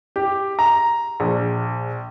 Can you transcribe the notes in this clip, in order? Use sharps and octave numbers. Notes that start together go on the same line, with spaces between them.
G4
A#5
A#1